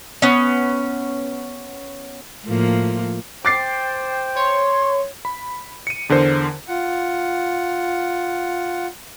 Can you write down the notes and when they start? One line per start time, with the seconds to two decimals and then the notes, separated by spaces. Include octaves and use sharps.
0.22 B3 C#4
2.46 A2 F3 A#3
3.45 C5 G5 D6 A6 C7
4.36 C#5 C6
5.25 B5
5.87 C#7 D#7
6.09 E2 D3 A#4 C5
6.67 F4 F#5